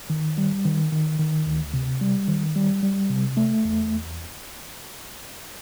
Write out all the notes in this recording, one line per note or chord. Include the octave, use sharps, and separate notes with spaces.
D#3
G3
D#3
D#3
D#3
D2
C3
G3
D#3
G3
G3
C3
A3
E2